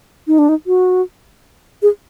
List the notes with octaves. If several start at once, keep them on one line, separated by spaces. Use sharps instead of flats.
D#4
D4
D#4
F#4
G#4